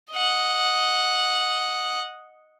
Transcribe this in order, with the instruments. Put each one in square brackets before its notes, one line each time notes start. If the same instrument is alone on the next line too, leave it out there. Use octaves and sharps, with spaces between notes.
[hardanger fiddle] D#5 F#5